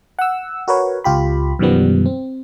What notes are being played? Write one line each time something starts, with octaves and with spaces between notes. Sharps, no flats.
F#5 E6
F#4 A#4 B4 C#5
C#2 F4 G4 B5
F#2 B2 D#3 F3 G3 B3
C4